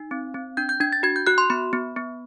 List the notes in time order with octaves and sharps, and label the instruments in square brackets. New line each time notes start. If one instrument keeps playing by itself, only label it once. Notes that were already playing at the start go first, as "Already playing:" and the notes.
Already playing: [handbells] D#4
C4
C4
D4 G6
G6
D4 G#6
A6
F#4 G#6
G6
F#4 F#6
C6
B3 B5
B3
B3